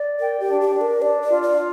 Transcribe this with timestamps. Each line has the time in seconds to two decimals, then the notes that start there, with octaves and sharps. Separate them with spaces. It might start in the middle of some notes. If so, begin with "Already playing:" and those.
Already playing: D5
0.19 A#4 G5
0.40 G4
0.47 D4
0.61 G4
0.75 D4
0.81 A#4
1.01 D4 D5
1.22 D5
1.29 F4
1.43 D5
1.56 F4